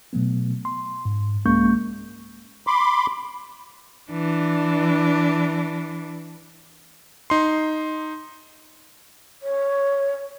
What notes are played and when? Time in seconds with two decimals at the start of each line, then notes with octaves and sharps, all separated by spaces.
0.13 B2 F#3 A3 B3
0.65 C6
1.05 G#2
1.46 C2 G#3 A#3 C#4 C#6 G6
2.67 B5 C6 D6
4.11 E3 D4
7.30 D#4 C6
9.43 C#5